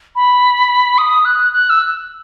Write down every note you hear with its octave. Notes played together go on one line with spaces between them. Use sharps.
B5
D#6
F#6
F#6
E6